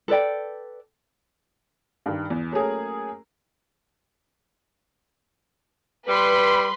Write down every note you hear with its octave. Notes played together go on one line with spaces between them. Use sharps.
A4 B4 D5 G5
G2 D#3
E2
F#3 A3 A#3 C#4 G#4 A#4
G3 B4 B5 C6